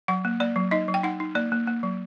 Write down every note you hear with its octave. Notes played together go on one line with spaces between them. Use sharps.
F#3 F#5
A#3
A#3 D5
F#3
D#4 D#5
F#3
G5
D#4 F#5
D#4
A#3 D5
A#3
A#3
F#3